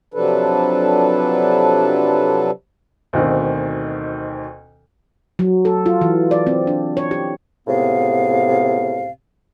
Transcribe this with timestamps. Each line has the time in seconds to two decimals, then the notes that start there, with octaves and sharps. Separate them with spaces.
0.14 C3 F3 F#3 D4 A4 B4
3.13 D2 B2 D#3 C4
5.39 F#3
5.65 A4
5.86 F4
6.01 E3
6.31 D5
6.47 C4
6.67 D4
6.97 C#5
7.11 G4
7.67 C#2 A2 C3 B3 F5